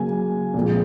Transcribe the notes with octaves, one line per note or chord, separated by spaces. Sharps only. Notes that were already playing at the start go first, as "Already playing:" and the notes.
Already playing: C#3 F#3 A#3 G#5
A#2 F3 G#3 C4